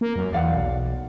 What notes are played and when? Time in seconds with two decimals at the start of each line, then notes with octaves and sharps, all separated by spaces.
0.01 A#3
0.16 F#2
0.33 E2 D5 F5 F#5
0.53 B1